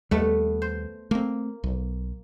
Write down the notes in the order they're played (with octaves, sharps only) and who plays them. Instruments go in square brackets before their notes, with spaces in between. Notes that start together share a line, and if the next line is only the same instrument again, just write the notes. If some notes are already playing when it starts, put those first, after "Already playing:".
[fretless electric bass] D#2 G3 [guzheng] A3 B3
[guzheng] C5
[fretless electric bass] A3 C4 [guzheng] A#3
[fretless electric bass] B1